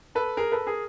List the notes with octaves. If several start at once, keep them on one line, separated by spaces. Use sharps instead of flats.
A4 B4
G#4 A#4
A4 B4
G#4 A#4